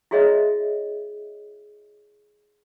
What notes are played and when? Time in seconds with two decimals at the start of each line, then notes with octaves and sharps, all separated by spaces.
0.11 E4 F#4 G#4 C#5 D#5 E5